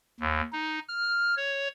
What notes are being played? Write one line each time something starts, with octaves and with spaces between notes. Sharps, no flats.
D#2
D#4
F6
C#5